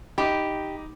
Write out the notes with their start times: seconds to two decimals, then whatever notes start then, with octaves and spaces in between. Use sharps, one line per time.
0.18 D#4 G4 D#5 B5